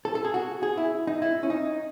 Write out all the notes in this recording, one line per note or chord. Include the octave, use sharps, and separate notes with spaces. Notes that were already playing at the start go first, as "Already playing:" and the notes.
A4
A4
G#4
F#4
G#4
E4
D#4
E4
C#4
D#4